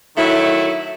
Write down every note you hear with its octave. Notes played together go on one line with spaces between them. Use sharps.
D#3 F#3 A3 E4